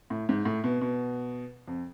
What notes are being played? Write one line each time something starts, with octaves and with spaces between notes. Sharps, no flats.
A2
G#2
A2
B2
B2
F2